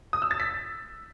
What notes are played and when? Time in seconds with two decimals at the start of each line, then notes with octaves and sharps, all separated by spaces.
0.13 D#6
0.22 E6
0.31 A6
0.40 B6